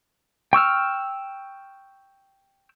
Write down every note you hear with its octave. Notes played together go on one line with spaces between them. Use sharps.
G5 C#6 E6 F6